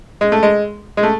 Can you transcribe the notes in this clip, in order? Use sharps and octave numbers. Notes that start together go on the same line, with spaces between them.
G#3
A3
G#3
G#3
A3